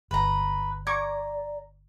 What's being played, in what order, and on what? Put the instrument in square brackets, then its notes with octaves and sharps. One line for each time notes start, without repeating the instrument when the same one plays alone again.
[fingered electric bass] G1 [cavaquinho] B4 A#5
[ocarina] D5 [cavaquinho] A#5 [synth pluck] C#6 D6 G#6